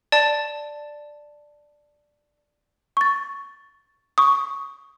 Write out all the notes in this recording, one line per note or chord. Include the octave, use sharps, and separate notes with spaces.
D5 A5
C#6 A6
C#6 D#6